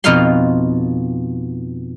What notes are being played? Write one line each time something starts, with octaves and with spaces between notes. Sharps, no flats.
F2 B2 D#4 F4 F5 C6